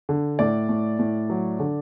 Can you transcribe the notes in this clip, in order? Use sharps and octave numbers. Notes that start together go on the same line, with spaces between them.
D3
A2 D5
A2
A2
F#3
D3